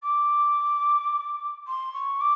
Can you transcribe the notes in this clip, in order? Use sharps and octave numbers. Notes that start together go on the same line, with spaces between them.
D6
C6
C#6
D6